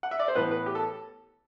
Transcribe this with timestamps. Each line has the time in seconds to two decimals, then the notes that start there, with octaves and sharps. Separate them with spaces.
0.03 F#5
0.11 E5
0.19 D5
0.28 C5
0.35 A2 E3 B3 B4
0.51 B4
0.66 G4
0.75 A4